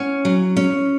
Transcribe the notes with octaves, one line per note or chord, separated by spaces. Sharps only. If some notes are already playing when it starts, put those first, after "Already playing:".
Already playing: C#4 F#5
F#3
C#4